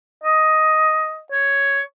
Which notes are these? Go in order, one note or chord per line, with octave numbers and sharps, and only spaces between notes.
D#5
C#5